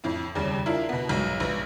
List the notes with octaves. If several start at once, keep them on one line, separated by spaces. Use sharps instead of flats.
F2 A2
D#2 C#3 G3
D4 E4 F4 A#4
B2 B3
B1 G#2
A#1 B4